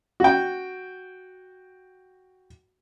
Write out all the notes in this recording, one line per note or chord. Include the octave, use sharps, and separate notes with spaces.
F#4 G5